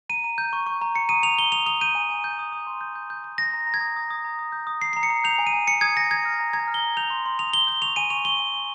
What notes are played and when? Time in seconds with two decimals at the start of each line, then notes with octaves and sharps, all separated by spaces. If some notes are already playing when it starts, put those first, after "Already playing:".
0.09 A#5 D#7
0.24 A#5
0.38 G6
0.53 C#6
0.67 C#6
0.82 A#5
0.95 A#5 C#7
1.09 D#6 D#7
1.23 D#6 F7
1.38 A#5 G7
1.52 D#6 F7
1.66 D#6 F7
1.81 G6 D#7
1.95 G#5
2.10 G#5
2.24 G6
2.39 D#6
2.52 D#6
2.67 C6
2.81 G6
2.95 G6
3.10 G6
3.24 G6
3.38 G6 A#6
3.53 A#5
3.67 A#5
3.74 G#6
3.81 D#6
3.96 D#6
4.10 D#6
4.25 A#5
4.39 D#6
4.52 G6
4.67 D#6
4.82 A#5 C7
4.93 A#5 C7
5.03 C#7
5.10 A#5
5.24 G6 F7
5.39 G#5
5.47 D#7
5.53 G#5
5.67 G#5 C#7
5.81 D#6 G#6
5.96 G#5 A#6
6.10 A#5 G#6
6.25 F6
6.40 A#5
6.53 A#5 G#6
6.68 F6
6.74 G7
6.82 A#5
6.97 G6 F7
7.10 C6
7.26 C6
7.39 D#6 F7
7.53 C6 G7
7.67 G6 G7
7.82 C#6 F7
7.96 G#5 D#7
8.10 C#6 F7
8.25 C#6 G7
8.40 G#5
8.54 C#6